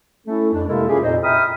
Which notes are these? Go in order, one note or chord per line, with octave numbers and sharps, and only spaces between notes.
A3 C#4 E4 A4
F2 D4
C3 G#3 A#3 E4 A4 A#4
C#4 E4 F4 G4 G#4
F2 A#2 D#4 C5 D#5
E5 G5 A#5 B5 D#6 F6